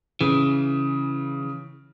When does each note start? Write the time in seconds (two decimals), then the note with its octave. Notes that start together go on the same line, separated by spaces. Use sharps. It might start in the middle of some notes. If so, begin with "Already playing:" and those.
0.21 C#3 E3